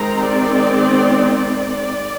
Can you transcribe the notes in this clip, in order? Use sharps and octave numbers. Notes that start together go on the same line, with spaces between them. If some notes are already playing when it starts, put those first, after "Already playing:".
Already playing: D#3 G#3 C4 A#5
D5
D5